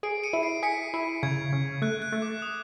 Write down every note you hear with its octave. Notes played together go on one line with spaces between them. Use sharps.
G#4 C7 D7
C#7 D#7
E4
C7 D7
G#4 B6 C#7
E4
C#3 G#6
C#3
A3 F#6
F#6
A3
D6
D#6